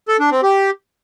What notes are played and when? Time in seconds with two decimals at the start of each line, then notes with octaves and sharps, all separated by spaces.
0.08 A4
0.20 D4
0.31 C4
0.43 G4